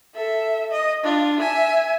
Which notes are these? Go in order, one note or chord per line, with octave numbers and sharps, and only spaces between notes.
A4 E5
D#5
D4 F4
E5 G#5